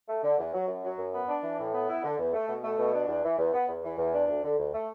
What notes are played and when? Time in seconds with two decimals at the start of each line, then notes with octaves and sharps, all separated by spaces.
0.08 A3
0.24 D3
0.38 E2
0.53 F#3
0.68 F#2
0.84 F#3
0.98 F#2
1.13 B3
1.28 D4
1.43 E3
1.58 A2
1.73 B3
1.88 E4
2.03 D3
2.19 E2
2.33 A3
2.48 B2
2.63 A3
2.78 B2
2.93 D4
3.08 E2
3.24 E3
3.38 E2
3.53 B3
3.68 E2
3.83 E3
3.98 E2
4.13 D4
4.28 D2
4.43 D3
4.58 D2
4.73 A3